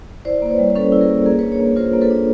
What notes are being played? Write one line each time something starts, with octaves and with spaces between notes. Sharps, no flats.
E4 C5 D5
A#3 C5
B4 C#5
G3
C5
C#4 A4 B4
E4
G#4 A#4
A#3
A#3 G#4 A#4
B4 C#5
D4
B4 C#5
A#3
F4 A#4 C5
A#3
A4 B4
D4